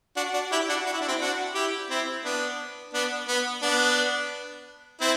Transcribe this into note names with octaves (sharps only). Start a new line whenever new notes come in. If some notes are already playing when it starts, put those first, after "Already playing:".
D4 F#4
D4 F#4
E4 G4
D4 F#4
F#4
E4
D4
C4 E4
D4 F#4
E4 G4
C4 E4
B3 D4
B3 D4
B3
B3 D4
C4 E4